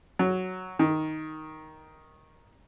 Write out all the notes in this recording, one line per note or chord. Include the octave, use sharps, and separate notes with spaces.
F#3
D#3